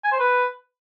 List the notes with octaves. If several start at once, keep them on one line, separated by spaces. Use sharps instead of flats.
G#5
C5
B4